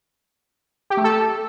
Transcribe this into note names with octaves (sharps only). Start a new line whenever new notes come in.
G4
A3
A4